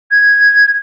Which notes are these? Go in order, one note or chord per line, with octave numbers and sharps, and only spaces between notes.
G#6